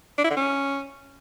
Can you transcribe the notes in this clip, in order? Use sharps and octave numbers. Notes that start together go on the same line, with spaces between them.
D4
E4
D3
C#4